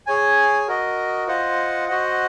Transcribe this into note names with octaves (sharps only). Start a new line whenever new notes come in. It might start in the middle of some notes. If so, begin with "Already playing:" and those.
G#4 C#5 G#5
F#4 A#4 D#5
F4 C5 D#5 F#5
F#4 C5 D#5 F#5